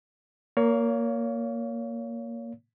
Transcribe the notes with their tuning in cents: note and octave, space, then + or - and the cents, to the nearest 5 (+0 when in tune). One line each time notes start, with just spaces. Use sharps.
A#3 +0 C#5 +30 F5 +0